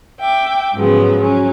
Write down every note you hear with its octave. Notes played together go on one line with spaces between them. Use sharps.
E5 G5 D6
G#2 C#3 F3 F#3 B3
F#3 C#4